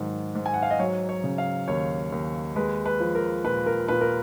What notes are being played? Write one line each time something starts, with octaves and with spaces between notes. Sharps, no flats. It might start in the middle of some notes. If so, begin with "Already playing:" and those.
Already playing: G#2 D#3 F#3
G#2
G#5
F#5
F5
D#5
F#3 C#5
C#5
C#3
F5
D#2 C#5
D#2
G#3 B4
B4
F3
A#4
A#2 B4
A#4
A#2 B4
A#4